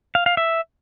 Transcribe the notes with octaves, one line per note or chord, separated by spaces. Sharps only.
F5
F5
E5